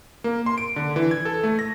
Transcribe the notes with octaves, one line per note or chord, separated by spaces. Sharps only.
A#3
C6
D7
D3
E3
G#6
A4
A3
A#6